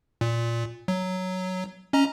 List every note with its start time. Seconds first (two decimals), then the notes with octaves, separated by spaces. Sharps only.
0.21 A#2
0.88 F#3
1.93 C#4 D#5 A#5